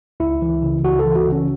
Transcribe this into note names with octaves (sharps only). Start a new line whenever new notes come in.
C#2 E4
E3
C#3
C#2 F#4
A4
E3
F#4
C#3
C#4